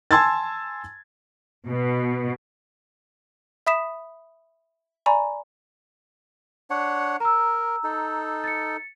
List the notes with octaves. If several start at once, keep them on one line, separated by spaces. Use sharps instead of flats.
G#5 A5 C6 E6 G#6 A6
B2
E5 B5 D#6 B6 E7
D5 G#5 A#5 B5 C#6
D4 C#5 F#5
A#4 A#5 E6
D#4 A4
A6 C#7